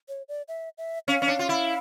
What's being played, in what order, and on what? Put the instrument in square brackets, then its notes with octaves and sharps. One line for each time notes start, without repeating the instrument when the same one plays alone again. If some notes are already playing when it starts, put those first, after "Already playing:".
[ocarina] C#5
D5
E5
E5
[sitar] C#4 [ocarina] F5
[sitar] C#4
D4
F4
E4